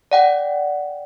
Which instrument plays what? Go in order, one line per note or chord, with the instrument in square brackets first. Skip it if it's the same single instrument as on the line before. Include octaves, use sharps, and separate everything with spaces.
[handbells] D5 F#5 G5